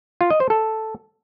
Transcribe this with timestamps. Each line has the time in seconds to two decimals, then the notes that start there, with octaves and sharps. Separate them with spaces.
0.21 F4
0.30 D#5
0.40 C5
0.50 A4